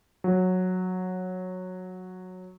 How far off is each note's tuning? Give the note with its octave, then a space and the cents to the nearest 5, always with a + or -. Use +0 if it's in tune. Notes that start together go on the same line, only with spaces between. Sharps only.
F#3 -10